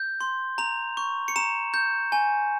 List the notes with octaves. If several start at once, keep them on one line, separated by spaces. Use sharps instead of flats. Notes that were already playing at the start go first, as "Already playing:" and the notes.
Already playing: G6
C6
A#5 F7
C#6
C#7
A#5 E7
G6
G#5